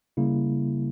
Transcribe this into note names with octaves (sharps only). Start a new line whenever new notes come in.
C#3 G3 A#3 E4